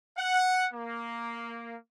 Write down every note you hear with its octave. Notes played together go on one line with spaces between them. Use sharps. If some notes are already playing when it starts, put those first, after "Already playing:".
F#5
A#3